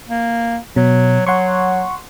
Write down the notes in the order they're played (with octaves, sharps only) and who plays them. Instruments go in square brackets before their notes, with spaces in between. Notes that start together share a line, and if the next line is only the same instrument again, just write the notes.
[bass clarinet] A#3
[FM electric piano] B2 [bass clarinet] F#3
[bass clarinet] F#3 [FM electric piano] F#5 C6 C#6